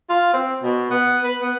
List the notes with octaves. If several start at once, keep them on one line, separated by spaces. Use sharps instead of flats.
F4
C4
B2
B3
B4
B3